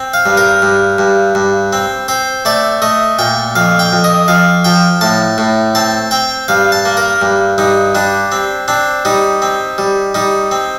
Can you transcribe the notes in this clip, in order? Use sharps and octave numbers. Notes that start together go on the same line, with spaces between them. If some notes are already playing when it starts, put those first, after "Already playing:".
Already playing: C4
F5
G2
A#4
G2
G2
G2
C4
C4 C5
A3 D5
A3 D#5
A#2 G5
F2 F5
G5
F2
D#5
F2 F5
F3 G5
A2 A5
A2
C4 A5
C4 G5
G2 F5
A5
A#3
A#4
G2
G2 D#4
G3 D4
C4
C4 D4
G3 D#4
C4
G3
G3 D#4
C4